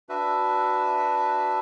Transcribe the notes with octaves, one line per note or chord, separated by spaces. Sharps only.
D4 F#4 B4 E5